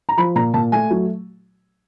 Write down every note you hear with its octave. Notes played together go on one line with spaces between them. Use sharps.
A#5
F3 B5
A#2 A#5
A#2 A5
A3 G#5
F#3